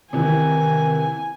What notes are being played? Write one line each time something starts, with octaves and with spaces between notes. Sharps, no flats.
C3 D#3 E3 G#5